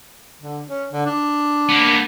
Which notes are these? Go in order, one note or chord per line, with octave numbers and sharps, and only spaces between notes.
D3
C#4
D3
D4
A#3 B3